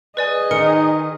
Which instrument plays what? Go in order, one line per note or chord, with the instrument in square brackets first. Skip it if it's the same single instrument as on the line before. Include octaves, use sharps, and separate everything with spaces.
[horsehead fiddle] G#4 D#5 [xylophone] B4 D5 G#5
[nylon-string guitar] D#3 [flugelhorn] D#4 [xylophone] A#4 C#7